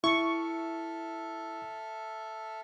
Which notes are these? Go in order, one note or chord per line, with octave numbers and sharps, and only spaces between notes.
E4 A4 E5 C#6 F6